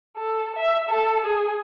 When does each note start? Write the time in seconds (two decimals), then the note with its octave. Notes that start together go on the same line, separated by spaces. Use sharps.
0.17 A4
0.56 E5
0.89 A4
1.25 G#4